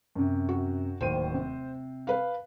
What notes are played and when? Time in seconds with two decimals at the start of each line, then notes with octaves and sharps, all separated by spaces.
0.15 F#2 C3
0.49 F#4
1.01 D1 D#2 C5 D#7
1.34 C3
2.07 B4 F5